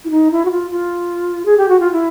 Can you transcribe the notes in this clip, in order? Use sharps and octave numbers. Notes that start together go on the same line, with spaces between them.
E4
D#4
E4
F#4
F4
F4
G#4
G4
F#4
F4
E4